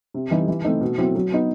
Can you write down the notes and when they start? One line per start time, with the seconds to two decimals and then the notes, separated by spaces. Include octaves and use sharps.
0.14 C3
0.31 E3 G3 D#4
0.48 E3
0.64 A3 C4 D#4
0.81 B2
0.98 F#3 C4 E4
1.15 F#3
1.32 B3 D#4